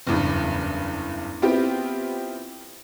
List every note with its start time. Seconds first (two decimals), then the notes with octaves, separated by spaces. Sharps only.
0.07 F#1 E2 G2
1.42 B3 C4 E4 F4 G4